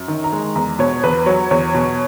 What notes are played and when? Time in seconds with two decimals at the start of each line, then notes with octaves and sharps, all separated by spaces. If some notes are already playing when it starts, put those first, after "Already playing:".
Already playing: F#2
0.08 D#3
0.24 A#5
0.33 G#3
0.55 E2 A#5
0.79 B2 C#5
1.03 E2 B4
1.26 F#3 C#5
1.51 E2 C#5
1.74 B2